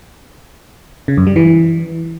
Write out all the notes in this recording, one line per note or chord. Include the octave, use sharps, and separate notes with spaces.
C#3
F#2
G3
E3